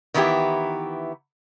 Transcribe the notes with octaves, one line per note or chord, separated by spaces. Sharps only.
D#3 E3 B3 E4 G4